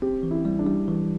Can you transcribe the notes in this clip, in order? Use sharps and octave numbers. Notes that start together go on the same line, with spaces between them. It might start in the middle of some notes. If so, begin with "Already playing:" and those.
C4 G4
E3
E4
G3
D4
G3
E3